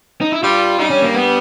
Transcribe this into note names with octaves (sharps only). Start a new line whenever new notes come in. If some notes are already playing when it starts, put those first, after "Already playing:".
D#4
E4
G2 G3 F4
G2 G3 D#4
C#4
A#3
B3